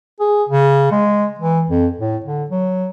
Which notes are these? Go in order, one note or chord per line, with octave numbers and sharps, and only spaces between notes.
G#4
C#3
G#3
E3
F2
A2
D3
F#3